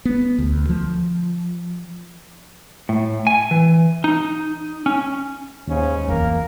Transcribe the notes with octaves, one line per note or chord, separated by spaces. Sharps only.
B3
D2
F3
A2
G#5
E3
D#4
C#4
D#2 G#2 C#3 C#4
F2 E3 A#3 A#4